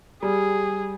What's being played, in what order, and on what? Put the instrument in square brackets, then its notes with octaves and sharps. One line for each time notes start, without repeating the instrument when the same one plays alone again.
[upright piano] G3 [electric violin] G#4